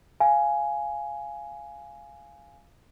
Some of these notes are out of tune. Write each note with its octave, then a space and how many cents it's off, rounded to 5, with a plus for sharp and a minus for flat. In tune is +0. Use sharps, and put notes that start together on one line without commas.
F5 -10 G#5 +5